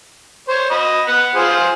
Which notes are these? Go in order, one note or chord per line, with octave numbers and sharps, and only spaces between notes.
C5 C#5
D#5 B5
F#5 B5
F4 G#4 C5